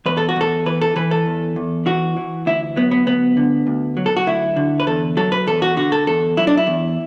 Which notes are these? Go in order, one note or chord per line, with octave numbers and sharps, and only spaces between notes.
E2 B4
A4
F#4
E2 A4
E3 B4
A4
E3 B4
A4
E2
E2
E3 F#4
E3
D2 E4
F#3 B3
B3
D2 B3
D3
D2
F#3
A4
F#4
D2 E4
D3
B4
E2 A4
F#3 A4
B4
E2 A4
F#4
D3 F#4
A4
E2 A4
F#3 E4
D4
E4
E2